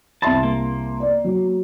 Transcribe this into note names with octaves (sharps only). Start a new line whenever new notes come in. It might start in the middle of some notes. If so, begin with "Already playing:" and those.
C2 E5 A5 C6
A#3
D5
F#3